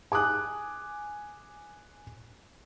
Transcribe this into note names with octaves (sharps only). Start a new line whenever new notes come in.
G#5 D6 D#6 F#6